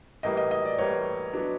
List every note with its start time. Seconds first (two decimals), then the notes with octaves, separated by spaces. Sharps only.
0.23 A2 E3 G3 A#3 D#5
0.37 D#5
0.51 D#5
0.65 D5
0.78 A2 E3 G3 A#3 C#5
1.33 F#3 B3 D4